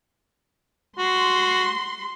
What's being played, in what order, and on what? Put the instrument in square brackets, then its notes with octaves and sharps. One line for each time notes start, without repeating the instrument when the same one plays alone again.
[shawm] F#4 [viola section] C6